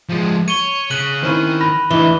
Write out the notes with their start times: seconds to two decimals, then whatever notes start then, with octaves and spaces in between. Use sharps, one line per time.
0.09 F3 G#3
0.48 C#5 D#7 G7
0.90 C#3 F#6 D#7 F#7
1.23 D#3 C4 C#4 E4
1.61 B5 A#6
1.91 D2 E3 D#4 G7